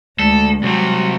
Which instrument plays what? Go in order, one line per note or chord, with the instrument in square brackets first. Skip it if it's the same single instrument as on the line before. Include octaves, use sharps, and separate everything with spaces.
[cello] D2 D3 [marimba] G#3 [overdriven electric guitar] A4
[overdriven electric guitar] C2 C3 [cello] F#3 F#4